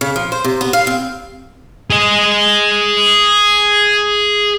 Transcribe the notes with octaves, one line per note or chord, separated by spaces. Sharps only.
C#3
F3
C5
C3
B3
F5
C4
G#4 D#5